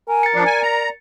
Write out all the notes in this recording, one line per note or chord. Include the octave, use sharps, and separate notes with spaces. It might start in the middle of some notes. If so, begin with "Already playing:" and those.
A#4 G#5
A6 C#7
F3 D4 D5
G#5
A#5